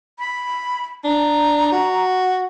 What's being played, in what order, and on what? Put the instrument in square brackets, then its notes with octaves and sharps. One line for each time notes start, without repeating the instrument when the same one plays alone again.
[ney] B5
[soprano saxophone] D4 [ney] A#5
[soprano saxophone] F#4